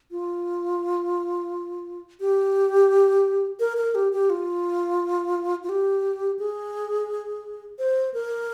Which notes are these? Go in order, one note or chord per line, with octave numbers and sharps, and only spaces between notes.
F4
G4
A#4
A#4
G4
G4
F4
F4
G4
G#4
C5
A#4